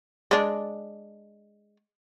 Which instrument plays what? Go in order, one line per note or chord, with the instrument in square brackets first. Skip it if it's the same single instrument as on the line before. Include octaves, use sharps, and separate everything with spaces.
[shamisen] G#3 D4